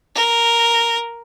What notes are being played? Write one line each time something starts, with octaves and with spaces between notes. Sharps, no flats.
A#4